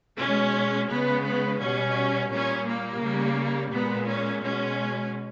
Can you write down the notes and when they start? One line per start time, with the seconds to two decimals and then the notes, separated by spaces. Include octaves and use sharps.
0.18 B2 G#3 C#4
0.89 C#3 G#3 B3
1.25 B3
1.60 B2 G3 C#4
2.30 A#2 G3 C#4
2.66 A#3
3.02 C#3 G3
3.72 A#2 G#3 B3
4.07 C#4
4.42 B2 G#3 C#4